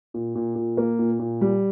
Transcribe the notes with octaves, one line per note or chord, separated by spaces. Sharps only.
A#2
A#2
A#2
A#3
A#2
A#2
G3